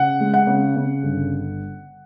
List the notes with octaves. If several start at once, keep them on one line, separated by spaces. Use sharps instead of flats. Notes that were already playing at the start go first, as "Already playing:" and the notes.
Already playing: C#3 F#5
G#3
F#5
C#3
C#3
G1